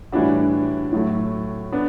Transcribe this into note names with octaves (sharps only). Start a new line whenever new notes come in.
A2 E3 G3 D4 F#4
A2 F#3 A3
B3 D4